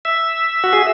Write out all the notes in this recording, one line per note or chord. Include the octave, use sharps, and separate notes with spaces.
E5
F#4
G#4